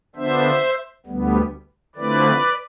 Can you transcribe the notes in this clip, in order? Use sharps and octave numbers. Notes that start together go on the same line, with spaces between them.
D3 F3 B3 D4 C5 E5
D2 D3 G3 B3
D3 F3 A3 C4 E4 B4 D5